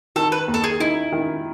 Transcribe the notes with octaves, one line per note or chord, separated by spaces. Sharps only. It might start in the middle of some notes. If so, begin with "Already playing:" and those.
D#3 A4
B4
D#2
A4
G#4
D#4 E4
D#3